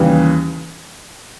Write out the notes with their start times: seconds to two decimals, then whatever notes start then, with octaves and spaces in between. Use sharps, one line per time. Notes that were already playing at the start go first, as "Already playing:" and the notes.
Already playing: D#2 C#3 E3 G3